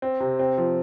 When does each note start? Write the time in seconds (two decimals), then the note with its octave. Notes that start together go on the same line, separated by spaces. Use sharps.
0.02 C4
0.20 C3
0.39 C4
0.58 F3